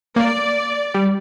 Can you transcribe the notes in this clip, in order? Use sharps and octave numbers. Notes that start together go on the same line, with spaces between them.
A#3 D5
G3